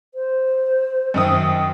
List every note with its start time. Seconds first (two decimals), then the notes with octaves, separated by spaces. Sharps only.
0.14 C5
1.14 F#2 D#3 D#6